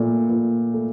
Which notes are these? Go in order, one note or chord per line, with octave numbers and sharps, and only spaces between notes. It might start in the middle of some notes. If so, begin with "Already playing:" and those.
Already playing: A#2 A3
A#2
A3